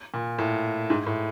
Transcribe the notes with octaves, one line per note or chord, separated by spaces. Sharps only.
A#2
A2
G#2
A2